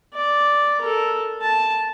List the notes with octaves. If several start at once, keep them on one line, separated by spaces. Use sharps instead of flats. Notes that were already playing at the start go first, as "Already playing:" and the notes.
D5
A4 A#4
A5